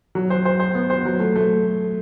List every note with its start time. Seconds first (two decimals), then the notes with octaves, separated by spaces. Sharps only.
0.15 F#3
0.30 C5
0.45 C5
0.60 C5
0.75 B3
0.90 C5
1.05 F#3
1.20 A3
1.35 A3